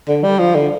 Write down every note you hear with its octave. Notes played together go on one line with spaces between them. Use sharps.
D3
G3
F3
D3